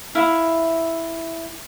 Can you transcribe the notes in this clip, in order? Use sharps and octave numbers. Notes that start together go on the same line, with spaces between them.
E4 E5 F5